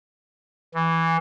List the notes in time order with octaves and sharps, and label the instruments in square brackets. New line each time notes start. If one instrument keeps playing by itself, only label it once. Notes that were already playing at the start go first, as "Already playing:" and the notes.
[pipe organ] E3